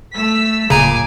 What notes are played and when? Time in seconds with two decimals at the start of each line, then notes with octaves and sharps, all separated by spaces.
0.15 A3 E6 B6
0.70 D1 A#2 C#3 G#5 A#5 D6